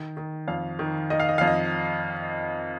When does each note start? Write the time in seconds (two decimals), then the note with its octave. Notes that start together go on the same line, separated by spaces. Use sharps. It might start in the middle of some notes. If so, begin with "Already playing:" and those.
Already playing: D#3
0.17 D#3
0.48 F2 F5
0.79 D#3
1.10 D#3 D#5
1.20 F5
1.29 D#5
1.38 F2 F5
1.47 D#5